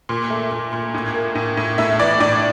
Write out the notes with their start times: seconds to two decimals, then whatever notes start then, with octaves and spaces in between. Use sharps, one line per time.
0.09 A#2
0.30 A3
0.51 A#2
0.73 A#2
0.94 A2
1.14 A#3
1.35 A2
1.57 A2
1.78 A2 E5
2.00 E3 D5
2.20 A2 D5